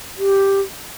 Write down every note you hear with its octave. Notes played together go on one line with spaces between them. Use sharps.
G4